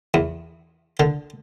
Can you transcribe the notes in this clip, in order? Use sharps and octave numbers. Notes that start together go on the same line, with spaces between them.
E2
D3